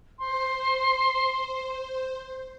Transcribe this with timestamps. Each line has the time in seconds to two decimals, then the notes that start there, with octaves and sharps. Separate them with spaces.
0.19 C5 C6